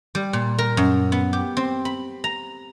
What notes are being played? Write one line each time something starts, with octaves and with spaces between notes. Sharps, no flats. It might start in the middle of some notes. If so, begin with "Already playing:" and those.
G3
A#2
A#4
F#2
B3
G4
C4
B5
A#5